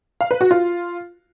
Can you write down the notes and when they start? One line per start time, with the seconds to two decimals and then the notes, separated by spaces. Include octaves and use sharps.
0.21 F5
0.31 B4
0.41 F#4
0.51 F4